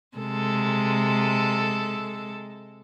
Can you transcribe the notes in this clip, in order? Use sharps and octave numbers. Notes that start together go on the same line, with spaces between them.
C3 G#3 A4